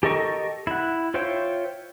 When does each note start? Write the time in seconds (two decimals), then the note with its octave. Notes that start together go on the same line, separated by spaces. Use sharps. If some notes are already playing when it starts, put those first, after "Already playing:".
0.03 G4 A4 A#4 D#5 C#6
0.67 E4 F#5
1.14 F4 C5 C#5 E5 G5